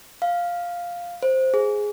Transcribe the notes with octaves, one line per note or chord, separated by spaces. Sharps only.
F5
C5
G#4